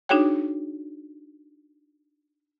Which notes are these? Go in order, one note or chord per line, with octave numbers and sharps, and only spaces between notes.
D4 D#4 F#4 G#4 C#5 G5